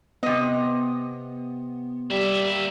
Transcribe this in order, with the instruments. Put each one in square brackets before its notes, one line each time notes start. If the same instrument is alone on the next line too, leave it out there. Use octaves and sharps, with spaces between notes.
[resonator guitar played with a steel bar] C3 D#5 [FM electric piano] B3
[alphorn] G3 [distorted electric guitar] A#3 E5